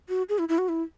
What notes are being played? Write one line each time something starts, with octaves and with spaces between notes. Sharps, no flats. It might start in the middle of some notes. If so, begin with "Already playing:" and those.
F#4
G#4
E4
E4
F#4
E4